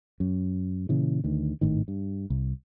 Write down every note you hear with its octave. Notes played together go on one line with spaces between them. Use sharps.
F#2
A#2 C#3 E3
D2 D#3
G#1 A2 D#3
G2
C2